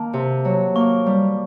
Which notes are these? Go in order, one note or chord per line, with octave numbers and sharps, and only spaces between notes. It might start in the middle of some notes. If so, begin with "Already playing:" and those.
Already playing: D#3 A#3 A5
C3
F#3
A#3 C#6
G3